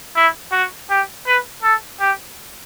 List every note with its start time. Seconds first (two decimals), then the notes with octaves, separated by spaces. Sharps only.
0.15 E4
0.52 F#4
0.89 G4
1.26 B4
1.63 A4
2.00 G4